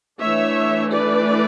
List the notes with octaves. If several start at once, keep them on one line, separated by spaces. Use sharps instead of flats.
E3 A3 D4 C#5 E5
B4 D5